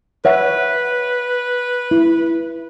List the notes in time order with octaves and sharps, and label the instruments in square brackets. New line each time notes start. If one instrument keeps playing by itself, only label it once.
[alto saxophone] B4 [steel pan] C#5 E5 F#5
[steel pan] E4